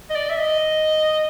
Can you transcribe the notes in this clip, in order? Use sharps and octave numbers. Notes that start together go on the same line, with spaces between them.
D#5
D5
E5
D#5